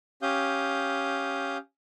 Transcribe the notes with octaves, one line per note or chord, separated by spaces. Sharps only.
C#4 G4 F5 D#6 G6